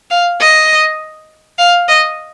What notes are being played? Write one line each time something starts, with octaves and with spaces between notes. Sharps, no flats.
F5
D#5
F5
D#5